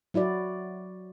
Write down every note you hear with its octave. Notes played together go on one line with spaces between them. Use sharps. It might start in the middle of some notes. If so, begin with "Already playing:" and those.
F#3 E4 F#4 D5